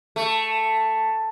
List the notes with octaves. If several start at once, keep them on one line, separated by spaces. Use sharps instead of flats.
A3